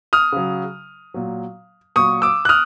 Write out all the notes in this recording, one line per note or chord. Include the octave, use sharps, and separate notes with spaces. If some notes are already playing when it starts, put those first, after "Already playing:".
D#6 F6
C#3 F#3
A#2 F#3
A#2 F#3 C#6 D#6
D6 E6
F#6
D#6 F6